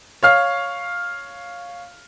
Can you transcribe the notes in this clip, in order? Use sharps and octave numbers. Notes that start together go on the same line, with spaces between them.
C#5 F5 F6